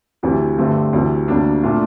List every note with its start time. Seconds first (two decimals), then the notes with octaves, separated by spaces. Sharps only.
0.23 D2 C3 E3
0.58 G2 D3 A3 C4
0.93 D2 C3 E3
1.28 D2 C3 G3 A#3 D4
1.63 A#2 A3 D4 F4